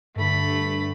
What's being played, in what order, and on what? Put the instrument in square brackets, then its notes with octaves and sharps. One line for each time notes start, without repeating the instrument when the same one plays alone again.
[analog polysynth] G2 D3 [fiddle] A3 B5